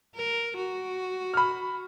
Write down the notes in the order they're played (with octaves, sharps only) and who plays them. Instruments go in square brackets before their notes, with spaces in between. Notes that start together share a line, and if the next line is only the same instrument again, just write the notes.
[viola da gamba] A#4
F#4
[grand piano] B5 F6